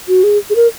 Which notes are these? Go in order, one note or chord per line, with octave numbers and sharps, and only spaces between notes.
F#4
G#4
G#4
A#4